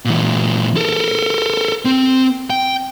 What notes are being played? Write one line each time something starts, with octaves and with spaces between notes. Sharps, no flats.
A#2 E3
A4 A#4
C4
G5